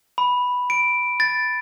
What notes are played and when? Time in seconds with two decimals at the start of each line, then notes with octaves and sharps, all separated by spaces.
0.18 B5
0.70 D7
1.20 A6